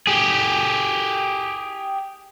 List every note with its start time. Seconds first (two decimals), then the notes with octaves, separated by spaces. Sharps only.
0.07 G4 G#4